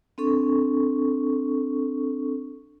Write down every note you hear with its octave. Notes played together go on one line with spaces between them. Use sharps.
C4 D4 A4 C#6